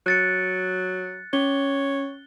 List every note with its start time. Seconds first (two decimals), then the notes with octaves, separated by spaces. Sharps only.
0.06 F#3 F#6 A6 C#7
1.33 C#4 C#5 G7